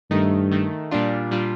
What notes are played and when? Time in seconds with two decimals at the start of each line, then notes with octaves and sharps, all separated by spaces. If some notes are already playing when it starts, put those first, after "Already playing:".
0.11 G2 D#3 A3 D#4
0.51 D#3 A3 D#4
0.91 A#2 G3 D4 F4
1.31 A#2 G3 D4 F4